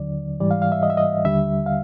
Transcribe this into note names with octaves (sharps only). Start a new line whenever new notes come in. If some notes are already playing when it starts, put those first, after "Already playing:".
Already playing: D#2 D3 F#3 D5
G#2 E3 G3 D5
F5
F5
E5
D#5
E5
D#5
D#2 D3 G3 E5
F5